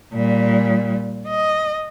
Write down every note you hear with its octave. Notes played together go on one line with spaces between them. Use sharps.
A#2 G3
D#5